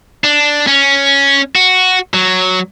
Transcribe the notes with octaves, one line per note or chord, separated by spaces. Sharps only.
D4
C#4
F#4
F#3